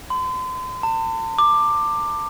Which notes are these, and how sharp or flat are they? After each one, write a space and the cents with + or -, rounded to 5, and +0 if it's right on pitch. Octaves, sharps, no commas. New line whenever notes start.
C6 -40
A5 +40
D6 +15